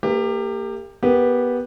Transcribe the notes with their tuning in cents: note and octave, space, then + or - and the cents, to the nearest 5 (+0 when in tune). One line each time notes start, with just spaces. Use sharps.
A#3 -30 G4 +20 B4 +0
B3 -10 G4 +0 A#4 +0